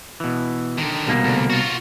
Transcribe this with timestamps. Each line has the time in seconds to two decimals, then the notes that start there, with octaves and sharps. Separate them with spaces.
0.20 B2 E3
0.78 D3 D#3
1.07 C2 B2 A#3
1.24 D2
1.50 F4 F#4